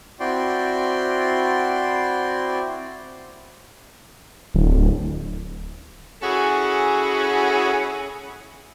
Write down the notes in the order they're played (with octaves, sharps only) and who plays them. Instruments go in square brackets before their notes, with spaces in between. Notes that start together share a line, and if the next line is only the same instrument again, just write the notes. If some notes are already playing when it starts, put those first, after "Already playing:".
[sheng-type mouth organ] C4 E4 F#4 D5 G5 C6
[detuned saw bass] D1
[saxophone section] C#4 E4 F#4 G#4 A4